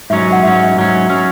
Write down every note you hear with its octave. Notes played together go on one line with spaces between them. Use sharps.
G#2 F#3 C#4 E5
F#5
G#2 F#3 C#4 E5
G#2 F#3 C#4
F#3 C#4